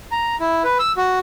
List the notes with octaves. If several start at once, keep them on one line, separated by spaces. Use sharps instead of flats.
A#5
E4
B4
E6
F#4